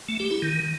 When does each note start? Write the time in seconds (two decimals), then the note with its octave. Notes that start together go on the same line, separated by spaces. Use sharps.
0.08 A3
0.20 G4
0.31 E4
0.42 D#3